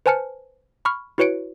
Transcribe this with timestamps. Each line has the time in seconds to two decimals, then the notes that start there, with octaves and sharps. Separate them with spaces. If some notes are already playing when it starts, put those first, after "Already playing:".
0.06 B4 C5 G#5 A5 F6 C#7
0.85 B5 C#6 F6
1.18 E4 F#4 B4 C#5 C#7 D7